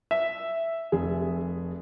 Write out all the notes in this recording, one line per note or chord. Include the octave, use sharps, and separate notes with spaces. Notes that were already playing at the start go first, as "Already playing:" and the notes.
E5
F1 G#4